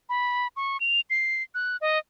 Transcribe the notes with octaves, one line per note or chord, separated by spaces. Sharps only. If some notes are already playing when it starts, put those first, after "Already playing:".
B5
C#6
F7
C7
F#6
D#5